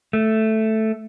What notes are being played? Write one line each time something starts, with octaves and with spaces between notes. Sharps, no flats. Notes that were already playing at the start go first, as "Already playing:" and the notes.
A3